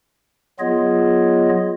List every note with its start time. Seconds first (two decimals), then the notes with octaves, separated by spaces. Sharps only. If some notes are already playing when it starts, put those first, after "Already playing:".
0.59 F#3 B3 F4 G#4 C#5 D#5